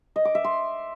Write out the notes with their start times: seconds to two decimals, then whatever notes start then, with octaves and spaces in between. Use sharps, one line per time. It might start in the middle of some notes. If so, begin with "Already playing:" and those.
0.16 D#5
0.25 D6
0.35 E5
0.44 C6